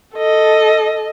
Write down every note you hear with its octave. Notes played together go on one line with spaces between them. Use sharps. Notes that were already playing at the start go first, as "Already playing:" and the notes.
A4 D#5